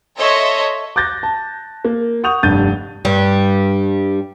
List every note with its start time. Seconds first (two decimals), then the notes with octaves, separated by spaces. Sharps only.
0.18 A4 C#5 D#5 E5 C6
0.96 D6 F#6 G6 A6 A#6
1.23 A5
1.85 A#3
2.23 F#5 C#6 D#6 G6 F7
2.43 F1 G2 G6 A6 D#7
3.05 G2 G3